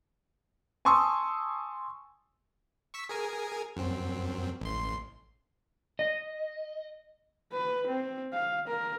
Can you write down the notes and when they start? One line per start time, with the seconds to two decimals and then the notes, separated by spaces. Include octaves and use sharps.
0.85 G#5 A5 C6 C#6 D#6 E6
2.94 C#6 E6 B6
3.09 G#4 A#4 G#5
3.77 F#2 C4
4.61 A1 C6
5.99 D#5
7.52 B4
7.87 C4
8.33 F5
8.67 A#4